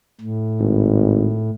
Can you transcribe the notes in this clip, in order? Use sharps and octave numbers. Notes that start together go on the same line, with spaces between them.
A2
G#1